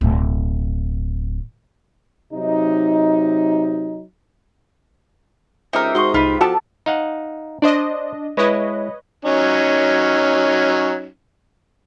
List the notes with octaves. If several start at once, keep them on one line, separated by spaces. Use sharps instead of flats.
D1 B2
C3 F#3 D#4
C#2 C3 D#4 A#4 E5 D6
G#2 F#4 C5 D#5 C#6
C2 D#4 F4 G4 B4 B5
F3 B3 F#4 G4 A4 A5
D#4 F5 F#5
D4 C5 D5 D#5
G#3 E4 B4 C#5 D#5
F#3 C#4 D#4